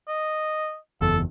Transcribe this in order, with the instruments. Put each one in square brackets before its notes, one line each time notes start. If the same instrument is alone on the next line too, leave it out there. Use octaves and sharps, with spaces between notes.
[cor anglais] D#5
[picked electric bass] F#1 E2 [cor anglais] A4